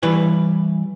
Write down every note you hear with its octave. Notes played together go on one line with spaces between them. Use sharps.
E3 G3 E4 B4 C#5